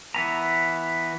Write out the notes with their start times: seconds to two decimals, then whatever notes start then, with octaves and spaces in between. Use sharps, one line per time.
0.15 E3 B3 A#5